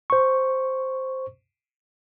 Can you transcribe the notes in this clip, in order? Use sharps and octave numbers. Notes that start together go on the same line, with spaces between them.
C5 C#6